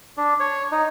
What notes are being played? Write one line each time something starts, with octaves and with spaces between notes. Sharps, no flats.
D4
C#5
D#4